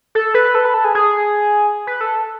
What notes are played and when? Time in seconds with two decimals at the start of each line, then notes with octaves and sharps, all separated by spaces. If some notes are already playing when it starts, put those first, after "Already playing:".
0.15 A4
0.34 B4
0.55 A4
0.65 B4
0.74 A4
0.84 G#4
0.95 G#4
1.87 B4
2.01 A4